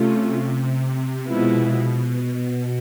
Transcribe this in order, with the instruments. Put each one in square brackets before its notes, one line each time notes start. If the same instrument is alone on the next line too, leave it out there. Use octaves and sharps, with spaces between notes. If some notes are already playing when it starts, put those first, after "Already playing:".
Already playing: [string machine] C3 [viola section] A3 C#4 F4
[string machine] B2 [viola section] F3 G#3 B3 E4